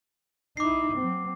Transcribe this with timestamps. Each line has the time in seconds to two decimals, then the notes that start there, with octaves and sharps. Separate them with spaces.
0.57 D#4 E4 D6 C7
0.97 F#3 C4